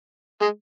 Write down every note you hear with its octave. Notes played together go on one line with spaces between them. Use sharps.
G#3